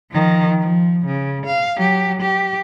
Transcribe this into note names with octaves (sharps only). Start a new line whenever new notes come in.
D#3 F3
F3
C#3
F5
F#3 G4
G4